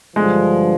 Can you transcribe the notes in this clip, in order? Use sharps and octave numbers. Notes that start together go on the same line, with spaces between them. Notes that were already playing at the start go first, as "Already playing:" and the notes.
G2 D3 F3 G#3